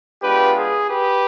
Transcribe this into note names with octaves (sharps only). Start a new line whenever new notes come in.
G#3 B3 D4 F4 G4 B4
G#4
G4 B4